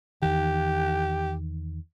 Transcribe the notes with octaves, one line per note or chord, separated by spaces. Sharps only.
E2 D#3 G4